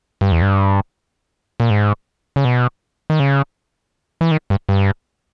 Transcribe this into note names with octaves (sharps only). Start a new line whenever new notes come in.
G2
E2
G2
A#2
G#2
C#3
B2
D#3
C#3
E3
D#3
G2
G2